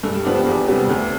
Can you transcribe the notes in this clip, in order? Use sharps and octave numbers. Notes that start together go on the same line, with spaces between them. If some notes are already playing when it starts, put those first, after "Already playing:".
G2 A4
G4
F3 B3 D4 A4
G4
E2
C3 G3 B3
D2 A4